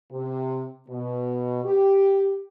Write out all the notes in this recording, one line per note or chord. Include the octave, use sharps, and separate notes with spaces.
C3
B2
G4